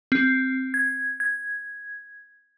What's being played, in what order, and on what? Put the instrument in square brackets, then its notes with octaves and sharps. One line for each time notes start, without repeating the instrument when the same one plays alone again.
[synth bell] C4
G#6
G#6